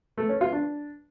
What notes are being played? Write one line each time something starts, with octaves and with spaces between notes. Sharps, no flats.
A3
C#4
F4
D4